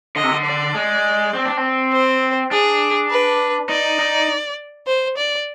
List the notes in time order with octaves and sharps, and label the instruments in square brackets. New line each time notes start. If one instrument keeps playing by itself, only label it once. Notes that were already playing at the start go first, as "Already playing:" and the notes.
[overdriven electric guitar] D3 [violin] D#5
[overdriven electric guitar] C3
D3
[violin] D5
[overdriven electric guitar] G#3
C4
D4
C4
[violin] C5
[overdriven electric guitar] D4 [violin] G#4
[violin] B4
[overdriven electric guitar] D#4 [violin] D5
[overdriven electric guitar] D#4
[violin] C5
D5